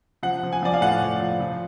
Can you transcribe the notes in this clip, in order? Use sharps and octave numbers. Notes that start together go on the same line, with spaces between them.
F3 F#5
F3
G#5
F3 D5
F5
A2 F#5
F3
F3
F3